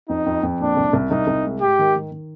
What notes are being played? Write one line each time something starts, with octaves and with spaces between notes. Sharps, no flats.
F2 D#4
F2
F2
A#2 D4
C2
C2
C2 D#4
C2
G#3
G#2 G4
D#3
D#3
D#3